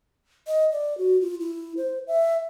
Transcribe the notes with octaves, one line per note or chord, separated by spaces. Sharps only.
D#5
D5
F#4
F4
E4
C5
E5